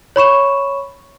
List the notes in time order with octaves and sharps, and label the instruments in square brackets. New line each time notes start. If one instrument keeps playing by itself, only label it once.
[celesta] C#5 B5 C#6 E7